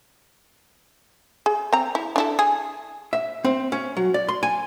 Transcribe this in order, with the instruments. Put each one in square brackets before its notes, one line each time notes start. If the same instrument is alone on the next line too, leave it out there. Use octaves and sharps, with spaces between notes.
[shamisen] G#4
C4 A#5
E4
D4 E4 A4
G#4
[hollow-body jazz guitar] E5
C4
C#4
F#3
D5
C6
G#5